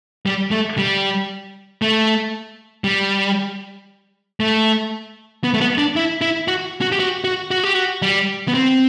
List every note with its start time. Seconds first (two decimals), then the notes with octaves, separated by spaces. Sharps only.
0.26 G3
0.51 A3
0.78 G3
1.82 A3
2.84 G3
4.40 A3
5.44 B3
5.54 A3
5.61 B3
5.78 D4
5.96 E4
6.21 E4
6.48 F#4
6.81 F#4
6.92 G4
7.00 F#4
7.24 F#4
7.51 F#4
7.64 G4
7.74 F#4
8.02 G3
8.48 B3
8.54 C4